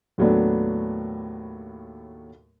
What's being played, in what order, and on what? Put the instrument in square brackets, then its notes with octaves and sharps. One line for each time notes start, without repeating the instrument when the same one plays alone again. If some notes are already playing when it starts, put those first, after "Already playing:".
[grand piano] D#2 A2 F#3 A3 B3 D4